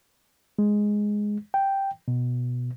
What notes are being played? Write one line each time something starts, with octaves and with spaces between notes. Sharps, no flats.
G#3
G5
B2